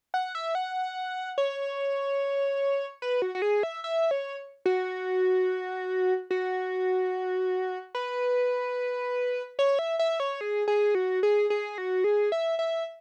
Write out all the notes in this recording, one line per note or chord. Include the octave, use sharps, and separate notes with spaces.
F#5
E5
F#5
C#5
B4
F#4
F#4
G#4
E5
E5
C#5
F#4
F#4
B4
C#5
E5
E5
C#5
G#4
G#4
F#4
G#4
G#4
F#4
G#4
E5
E5